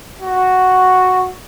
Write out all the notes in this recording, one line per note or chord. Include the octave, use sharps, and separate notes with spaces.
F#4